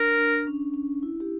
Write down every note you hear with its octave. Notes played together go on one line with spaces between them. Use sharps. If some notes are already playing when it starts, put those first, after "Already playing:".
Already playing: D4 A#4
D4
C#4
C#4
E4
G4